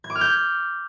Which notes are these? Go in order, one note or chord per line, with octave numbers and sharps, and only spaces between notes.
G#6
D6
F6
G6